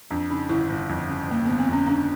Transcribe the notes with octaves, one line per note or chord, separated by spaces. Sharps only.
F2 D4
C#3 D#4
G1 E4
G1
F2
C#3
G1 A#3
G1 B3
C4
F2
C#4
C#3 D4